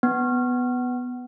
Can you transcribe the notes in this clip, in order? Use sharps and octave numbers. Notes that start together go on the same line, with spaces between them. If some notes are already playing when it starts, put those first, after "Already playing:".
B3